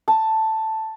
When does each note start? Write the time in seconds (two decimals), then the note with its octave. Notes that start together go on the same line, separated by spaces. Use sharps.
0.08 A5